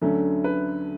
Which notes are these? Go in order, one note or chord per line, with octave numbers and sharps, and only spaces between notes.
D2 D3 F#3 A3 C#4
B4